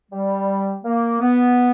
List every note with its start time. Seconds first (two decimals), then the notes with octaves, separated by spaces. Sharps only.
0.11 G3
0.84 A#3
1.21 B3